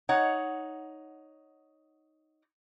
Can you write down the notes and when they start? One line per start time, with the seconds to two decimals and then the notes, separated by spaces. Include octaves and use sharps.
0.09 D#4 C#5 F#5